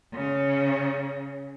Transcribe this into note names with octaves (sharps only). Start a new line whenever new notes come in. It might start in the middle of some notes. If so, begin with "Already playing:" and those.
C#3